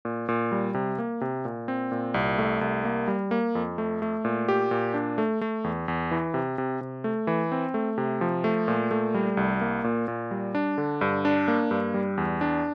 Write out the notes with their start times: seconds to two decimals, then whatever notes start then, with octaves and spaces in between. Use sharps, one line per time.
0.05 A#2
0.29 A#2
0.52 G3
0.74 C3
0.99 A#3
1.21 C3
1.45 A#2
1.68 C4
1.92 A#2
2.14 C2
2.38 A3
2.61 C2
2.85 A#3
3.08 G3
3.31 A#3
3.55 F2
3.78 A3
4.02 A3
4.25 A#2
4.48 G4
4.71 A#2
4.94 D4
5.18 A3
5.41 A3
5.64 E2
5.88 E2
6.11 E3
6.34 C3
6.58 C3
6.81 C3
7.04 A3
7.27 E3
7.52 C4
7.74 A3
7.98 C3
8.21 F3
8.44 A3
8.68 A#2
8.91 A3
9.14 G3
9.37 C2
9.61 A#3
9.84 A#2
10.08 A#2
10.31 G3
10.55 D4
10.78 D3
11.01 G2
11.25 D4
11.48 A#3
11.71 G2
11.94 G3
12.18 E2
12.41 D4